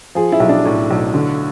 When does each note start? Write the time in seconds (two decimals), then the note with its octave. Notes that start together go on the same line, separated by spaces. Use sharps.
0.15 F3 G#4
0.32 E4
0.40 B1
0.49 D4
0.65 A2
0.90 B1
1.14 D3